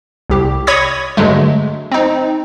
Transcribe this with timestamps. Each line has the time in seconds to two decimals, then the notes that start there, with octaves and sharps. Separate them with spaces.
0.30 C2 G4
0.67 C#5 B5 C#6 D#6 G#6 A#6
1.17 G2 D3 F#3 G#3 A3
1.92 C4 D#4